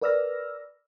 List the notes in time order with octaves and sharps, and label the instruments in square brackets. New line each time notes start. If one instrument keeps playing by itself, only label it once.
[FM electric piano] A#4 B4 D5 E6 F6 A#6